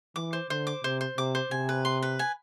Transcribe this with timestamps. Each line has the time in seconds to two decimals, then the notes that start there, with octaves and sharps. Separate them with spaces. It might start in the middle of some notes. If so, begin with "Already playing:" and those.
0.16 E3 D6
0.33 C5
0.50 D3 C5
0.67 D6
0.84 C3 C5
1.01 C5
1.17 C3 D6
1.35 C5
1.51 C3 G#5
1.69 B4
1.85 C6
2.02 B4
2.19 G#5